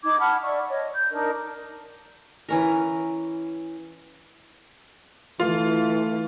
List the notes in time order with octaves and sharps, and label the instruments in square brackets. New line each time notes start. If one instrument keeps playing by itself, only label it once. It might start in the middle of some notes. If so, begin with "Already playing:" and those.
[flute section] D#4 D6 G#6
F#5 A5 B5 F6
D5 E5 C#6
C#5 D#5
G6
D4 D#4 A#4
[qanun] E3 C#4 A#4
[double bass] E3 [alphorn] A3 [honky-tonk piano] F4